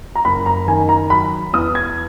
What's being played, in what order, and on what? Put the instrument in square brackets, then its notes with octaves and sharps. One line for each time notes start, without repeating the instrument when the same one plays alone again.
[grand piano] A#5
F#1 B5
A#5
D#3 G#5
A#5
F#3 B5
E2 D#6
G#6